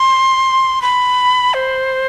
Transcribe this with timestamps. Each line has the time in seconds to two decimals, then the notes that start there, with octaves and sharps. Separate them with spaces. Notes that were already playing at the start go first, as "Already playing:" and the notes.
Already playing: C6
0.82 B5
1.54 C5